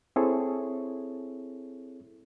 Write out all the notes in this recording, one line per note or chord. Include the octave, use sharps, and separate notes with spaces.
C4 E4 G#4 A4 C#5